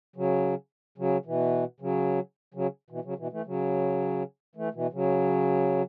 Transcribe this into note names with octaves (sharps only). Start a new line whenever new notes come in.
C#3 F#3
C#3 F#3
B2 E3
C#3 F#3
C#3 F#3
B2 E3
C#3 F#3
B2 E3
E3 A3
C#3 F#3
E3 A3
B2 E3
C#3 F#3